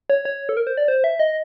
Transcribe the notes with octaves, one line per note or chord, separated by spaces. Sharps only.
C#5
C#5
A4
A#4
C5
D5
C5
E5
D#5